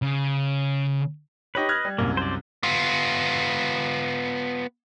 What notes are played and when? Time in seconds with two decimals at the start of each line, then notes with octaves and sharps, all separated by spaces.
0.02 C#3
1.55 D#4 G4 B4 C#5 D#5
1.69 F6 F#6 G#6
1.85 G3
1.98 C2 F#2 A#3
2.17 C5 D5
2.63 B3 F4